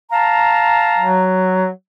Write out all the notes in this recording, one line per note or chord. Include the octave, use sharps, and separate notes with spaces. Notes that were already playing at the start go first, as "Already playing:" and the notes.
F5 A5 A#5
F#3